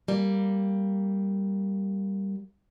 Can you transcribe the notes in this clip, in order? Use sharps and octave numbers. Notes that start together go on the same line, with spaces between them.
G3 A#3